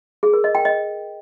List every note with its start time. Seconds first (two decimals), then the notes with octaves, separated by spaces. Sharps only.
0.23 G#4
0.33 A#4
0.44 D#5
0.55 G5
0.65 D#5